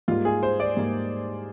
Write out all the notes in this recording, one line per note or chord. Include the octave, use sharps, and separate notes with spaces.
G#2 G3 A#3 F4
G#4
C5
D5
G#2 G3 A#3